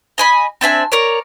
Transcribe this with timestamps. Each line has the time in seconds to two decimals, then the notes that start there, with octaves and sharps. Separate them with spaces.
0.18 D#5 G#5 B5
0.61 C4 D4 E5 G#5
0.92 A#4 C#5 D5